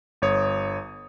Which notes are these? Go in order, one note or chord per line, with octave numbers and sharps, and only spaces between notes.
G1 C#5 D#6